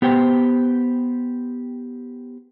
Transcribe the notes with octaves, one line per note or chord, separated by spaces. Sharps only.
B3 G4 C5 G5